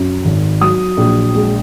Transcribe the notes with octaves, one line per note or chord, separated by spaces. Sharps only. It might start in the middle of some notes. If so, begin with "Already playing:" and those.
Already playing: F#2
G#1
F#3 D#6
A#1
G#3